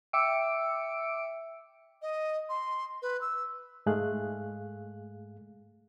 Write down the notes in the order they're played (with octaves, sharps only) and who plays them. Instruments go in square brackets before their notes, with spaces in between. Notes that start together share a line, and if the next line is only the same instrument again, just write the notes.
[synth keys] E5 G5 D6 E6 C#7 D7
[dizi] D#5
C6
B4
E6
[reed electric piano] G#2 G#3 A3 G#4 F5 F#6